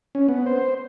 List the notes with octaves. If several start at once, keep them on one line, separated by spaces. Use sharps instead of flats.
C#4
B3
C5